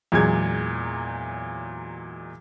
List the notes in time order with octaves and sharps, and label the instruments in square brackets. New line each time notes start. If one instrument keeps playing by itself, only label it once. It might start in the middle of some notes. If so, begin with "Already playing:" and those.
[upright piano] E2 A#2 F#3 G#3 G#6